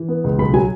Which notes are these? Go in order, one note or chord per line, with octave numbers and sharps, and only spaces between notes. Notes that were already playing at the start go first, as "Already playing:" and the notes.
Already playing: E3
B3
C#2
B1 B5
F#3 G#5